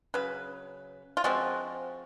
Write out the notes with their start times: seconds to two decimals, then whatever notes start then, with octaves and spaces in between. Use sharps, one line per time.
0.14 C#3 F#3 B4
1.17 F4
1.24 F3 G#3 C4 F#4